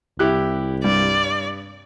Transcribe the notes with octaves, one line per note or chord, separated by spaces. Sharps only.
C2 E4 G4 F#6
G2 D5